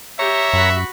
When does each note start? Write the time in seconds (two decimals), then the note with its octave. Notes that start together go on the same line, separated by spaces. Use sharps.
0.19 G4 C#5 E5 A#5
0.53 F#2 F#4 B5